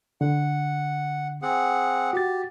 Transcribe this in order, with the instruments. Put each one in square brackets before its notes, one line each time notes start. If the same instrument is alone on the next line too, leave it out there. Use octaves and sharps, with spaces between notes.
[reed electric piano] D3 [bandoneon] F#5
[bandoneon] C4 G#4 F#5
[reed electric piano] F#4 A6 [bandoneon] G4